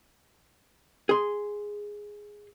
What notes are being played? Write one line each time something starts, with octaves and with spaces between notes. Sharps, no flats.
G#4 C6